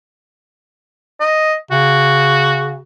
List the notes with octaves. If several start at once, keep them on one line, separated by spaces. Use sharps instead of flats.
D#5
C#3 F#4